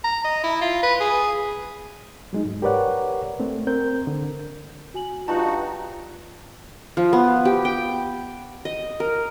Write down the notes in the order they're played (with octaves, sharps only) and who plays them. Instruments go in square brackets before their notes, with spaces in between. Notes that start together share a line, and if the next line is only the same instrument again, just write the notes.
[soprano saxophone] A#5
D#5
E4
F4
B4
G#4
[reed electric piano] F#3 G#3 D#4
G#2
G4 A#4 B4 C#5 D5 F#5
A3 C4
C4 A#4 G6
D3
[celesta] F#4 G#5 F#7
[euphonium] G2 [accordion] D#4 F#4 [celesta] F4 [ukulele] A5
[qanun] F3
B3
G4
G5
D#5
A#4